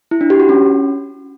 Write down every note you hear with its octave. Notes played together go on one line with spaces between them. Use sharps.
E4
D4
G4
F#4
C#4